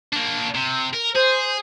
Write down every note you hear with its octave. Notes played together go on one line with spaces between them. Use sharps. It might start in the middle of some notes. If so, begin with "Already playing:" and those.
A#3 D4
C3
A#4
G#4 C5